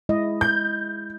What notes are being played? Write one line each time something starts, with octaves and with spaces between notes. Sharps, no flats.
G#3 E4 D#5
G6